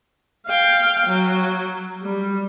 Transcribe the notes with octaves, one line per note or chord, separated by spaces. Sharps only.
F5 G5
F#3
G3